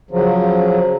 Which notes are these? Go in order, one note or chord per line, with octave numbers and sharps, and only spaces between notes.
C#3 F3 F#3